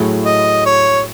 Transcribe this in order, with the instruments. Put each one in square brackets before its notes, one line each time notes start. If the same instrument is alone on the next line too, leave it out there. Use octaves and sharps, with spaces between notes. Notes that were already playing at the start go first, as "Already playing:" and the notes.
Already playing: [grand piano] A2 F#3 A3 E4 G#4
[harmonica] D#5
C#5